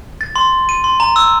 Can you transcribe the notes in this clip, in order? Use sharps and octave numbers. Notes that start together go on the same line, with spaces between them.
A6
C6
D#7
C6
A#5
E6